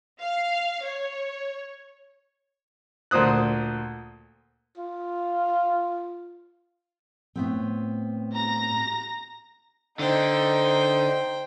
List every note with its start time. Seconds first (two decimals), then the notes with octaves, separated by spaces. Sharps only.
0.21 F5
0.84 C#5
3.11 D2 A#2 C5 D#6 F#6
4.77 F4
7.35 A2 B3 C4
8.33 A#5 A#6
9.99 D3 D#4 C5 G5